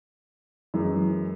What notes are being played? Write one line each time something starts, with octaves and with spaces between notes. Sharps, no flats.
F#2 E3 G#3